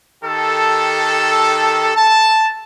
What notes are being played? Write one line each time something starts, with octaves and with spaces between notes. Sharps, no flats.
D#3 G4 A4
A5